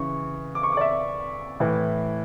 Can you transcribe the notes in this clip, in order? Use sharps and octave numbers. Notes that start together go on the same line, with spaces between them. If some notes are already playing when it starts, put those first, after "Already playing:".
Already playing: C#3 E3 C#6
D6
C#6
D5 D6
E5
A2 E3